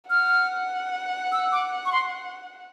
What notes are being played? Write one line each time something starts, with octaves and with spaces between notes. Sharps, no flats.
F#5 F6
E6
D6
C#6
C6